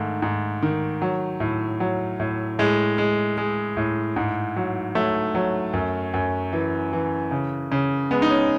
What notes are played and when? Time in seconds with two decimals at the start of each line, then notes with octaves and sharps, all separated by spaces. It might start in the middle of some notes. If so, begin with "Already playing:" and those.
Already playing: G#2 D#3 A3
0.22 G#2
0.63 D#3
1.02 F#3
1.40 A2
1.80 F#3
2.20 A2
2.59 A2 G#3
2.98 G#3
3.38 G#3
3.77 A2
4.16 G#2
4.56 F#3
4.95 F#3 A3
5.35 F#3
5.73 F#2
6.14 F#2
6.53 E3
6.93 E3
7.31 C#3
7.72 C#3
8.11 G#3 B3
8.22 D#4
8.30 C#4